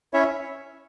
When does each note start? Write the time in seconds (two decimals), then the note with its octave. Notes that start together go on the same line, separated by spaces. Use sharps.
0.13 C#4 E4 C#5 E5